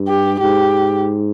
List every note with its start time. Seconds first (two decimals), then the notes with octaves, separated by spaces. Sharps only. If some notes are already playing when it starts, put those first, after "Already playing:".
Already playing: G2
0.08 G4
0.40 G#2 G4